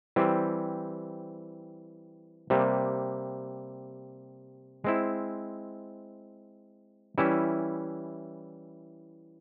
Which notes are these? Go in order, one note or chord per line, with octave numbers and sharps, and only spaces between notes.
E3 G3 C4
C3 G3 A#3
G#3 C4 E4
E3 G3 C#4 E4